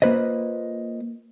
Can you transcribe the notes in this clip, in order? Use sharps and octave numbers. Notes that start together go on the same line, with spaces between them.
A#3 F4 B4 C5 D#5